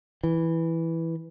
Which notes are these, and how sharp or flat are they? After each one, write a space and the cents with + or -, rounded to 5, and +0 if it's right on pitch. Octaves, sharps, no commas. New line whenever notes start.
E3 -5